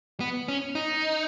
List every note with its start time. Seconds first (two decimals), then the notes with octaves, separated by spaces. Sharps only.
0.20 B3
0.48 C#4
0.75 D#4